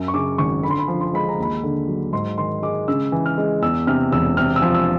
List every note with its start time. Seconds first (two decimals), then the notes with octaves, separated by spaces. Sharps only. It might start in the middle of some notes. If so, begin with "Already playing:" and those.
Already playing: F#2
0.08 C#6
0.14 C#3 D6
0.38 G#1 C#6
0.63 D3 B5
0.70 C6
0.78 B5
0.88 F3
1.01 C6
1.14 G#3 B5
1.29 A#5
1.39 D#2 B5
1.63 D3
1.88 F#3
2.13 G#2 C6
2.38 D#3 C6
2.62 G#3 D6
2.88 C#3 E6
3.12 E3
3.26 F6
3.38 G#3
3.62 E2 E6
3.87 C3 F6
4.12 E1 E6
4.37 C3 F6
4.56 E6
4.62 F3
4.74 E6